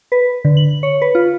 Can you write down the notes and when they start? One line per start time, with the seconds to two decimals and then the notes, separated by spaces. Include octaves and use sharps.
0.12 B4
0.45 D3
0.57 F#7
0.83 C#5
1.02 B4
1.15 F4